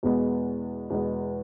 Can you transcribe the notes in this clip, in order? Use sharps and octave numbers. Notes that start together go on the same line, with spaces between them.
E2 B2 G#3 B3
E2 B2 G#3 B3